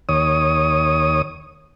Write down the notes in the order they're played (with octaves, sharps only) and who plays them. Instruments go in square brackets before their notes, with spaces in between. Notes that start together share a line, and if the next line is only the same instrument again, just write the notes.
[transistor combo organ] D#2 C#5 D#6